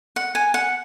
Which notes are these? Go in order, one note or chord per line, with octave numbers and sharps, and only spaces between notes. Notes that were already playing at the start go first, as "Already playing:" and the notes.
F#5
G#5
F#5